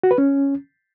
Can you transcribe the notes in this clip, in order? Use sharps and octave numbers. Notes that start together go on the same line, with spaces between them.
F#4
B4
C#4